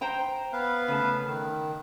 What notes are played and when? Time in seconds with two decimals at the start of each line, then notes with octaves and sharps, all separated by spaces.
0.01 C5 G5 A#5
0.53 B3 B4 F5
0.88 C#3 A3 A5
1.26 D#3